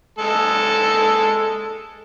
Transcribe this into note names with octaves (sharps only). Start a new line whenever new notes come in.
G#3 A4